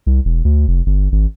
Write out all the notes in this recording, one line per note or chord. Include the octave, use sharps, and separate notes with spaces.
C2
E1
D2
F1
G1
G#1